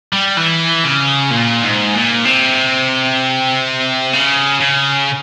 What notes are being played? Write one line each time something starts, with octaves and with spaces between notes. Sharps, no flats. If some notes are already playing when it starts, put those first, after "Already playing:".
G3
E3
C#3
A#2
G#2
A#2
C3
C#3
C#3